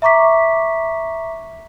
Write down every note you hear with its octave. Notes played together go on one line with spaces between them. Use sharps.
E5 A#5 C#6 D6 B6